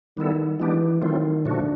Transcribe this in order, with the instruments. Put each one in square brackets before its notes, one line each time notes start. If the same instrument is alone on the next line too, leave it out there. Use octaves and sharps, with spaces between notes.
[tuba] D#3 [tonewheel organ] G3 B3 E4 A4
[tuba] E3 [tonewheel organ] G#3 B3 D4 G4
[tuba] D#3 [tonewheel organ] F#3 A3 C4 F4
[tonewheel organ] A#2 F3 A3 D4 F#4 [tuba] D3